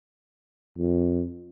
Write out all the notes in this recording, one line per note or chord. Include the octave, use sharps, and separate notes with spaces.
F2